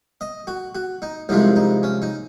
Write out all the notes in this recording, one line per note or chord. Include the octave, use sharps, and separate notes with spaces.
D#5
F#4
F#4
D#4
C2 C3 F3 G#3 D#4
D#4
C#4
D#4